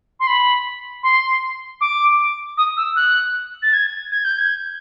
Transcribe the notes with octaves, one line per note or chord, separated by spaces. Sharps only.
C6
B5
C6
D6
D#6
E6
F#6
A6
G#6
G#6
G6
G#6